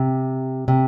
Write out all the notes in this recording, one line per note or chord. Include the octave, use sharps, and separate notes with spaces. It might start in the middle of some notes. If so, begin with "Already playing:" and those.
Already playing: C3
C3